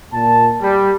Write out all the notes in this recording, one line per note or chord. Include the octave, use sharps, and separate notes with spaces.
A#2 A5
G3